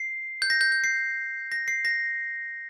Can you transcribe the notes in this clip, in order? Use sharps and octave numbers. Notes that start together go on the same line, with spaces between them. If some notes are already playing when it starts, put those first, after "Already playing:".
Already playing: C7
G6
A#6
G6
G6
C7
A#6
C7
A#6